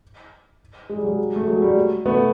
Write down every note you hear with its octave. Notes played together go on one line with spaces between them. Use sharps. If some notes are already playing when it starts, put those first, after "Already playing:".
G#3
G3
F#3 G#3
A3
F#3 G#3
G3 A3
A3 B3